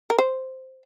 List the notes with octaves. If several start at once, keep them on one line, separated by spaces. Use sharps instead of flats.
A#4
C5